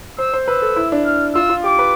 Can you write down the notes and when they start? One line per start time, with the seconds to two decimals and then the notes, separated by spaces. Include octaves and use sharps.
0.18 C5 E6
0.33 C5
0.48 B4 E6
0.62 A4
0.76 E4
0.92 D4
1.06 F6
1.35 F4 E6
1.50 F4
1.64 G4 D6
1.79 B4